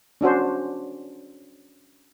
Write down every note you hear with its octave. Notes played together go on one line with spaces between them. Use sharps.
C#4 D4 F#4 C5